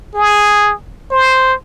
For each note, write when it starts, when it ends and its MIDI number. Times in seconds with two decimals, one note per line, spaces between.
0.15 0.73 68
1.11 1.54 72